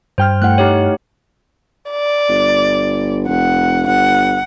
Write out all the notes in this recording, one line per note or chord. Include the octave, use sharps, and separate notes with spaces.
G2 C5 G5 F6
A3 E4 F#5 F#6
D#4 G4 C#5
D5
G1
F1 F#5
G1 F#5